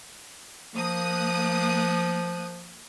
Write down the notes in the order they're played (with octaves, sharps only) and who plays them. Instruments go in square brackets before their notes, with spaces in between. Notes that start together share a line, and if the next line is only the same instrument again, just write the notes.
[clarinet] F3 [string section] A#3 D#6 F#6